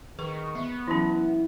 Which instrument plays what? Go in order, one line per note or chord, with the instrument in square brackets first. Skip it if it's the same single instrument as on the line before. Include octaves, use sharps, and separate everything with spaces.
[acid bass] D#3 [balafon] G#4 B4 [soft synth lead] C#6
[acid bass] B3 [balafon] E5
[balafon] E3 F#3 C#4 [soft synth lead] E4